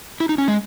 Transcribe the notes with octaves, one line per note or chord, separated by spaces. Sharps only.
E4
D#4
C#4
G#3